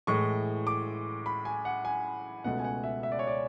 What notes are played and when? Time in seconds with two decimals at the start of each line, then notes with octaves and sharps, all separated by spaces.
0.07 A2 E3 G#3 C#6
0.67 D6
1.26 B5
1.45 G#5
1.65 F#5
1.85 G#5
2.44 C#2 B2 A3 F#5
2.59 G#5
2.64 F#5
2.84 E5
3.03 E5
3.12 D5
3.19 C#5
3.27 D5